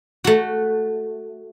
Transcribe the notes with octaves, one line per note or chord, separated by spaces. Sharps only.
A3 F#4